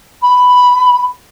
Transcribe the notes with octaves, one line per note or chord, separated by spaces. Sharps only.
B5